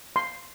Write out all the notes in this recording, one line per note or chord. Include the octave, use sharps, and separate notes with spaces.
C6